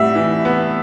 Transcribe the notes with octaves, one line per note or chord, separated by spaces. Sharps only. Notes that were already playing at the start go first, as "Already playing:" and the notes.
Already playing: A2 G3 E5 E6
E3
B3